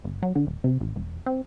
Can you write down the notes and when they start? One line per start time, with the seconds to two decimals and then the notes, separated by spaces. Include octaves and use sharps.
0.04 G1
0.22 F#3
0.35 D3
0.47 D#1
0.64 C3
0.80 A1
0.96 E1
1.26 C4